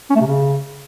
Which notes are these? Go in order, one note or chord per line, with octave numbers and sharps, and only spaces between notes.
C#4
A3
C3
C#3